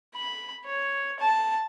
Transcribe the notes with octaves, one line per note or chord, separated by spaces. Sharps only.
B5
C#5
A5